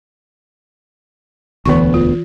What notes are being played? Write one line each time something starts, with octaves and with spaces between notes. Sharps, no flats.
E1 D2 E3 B3 C#6
F4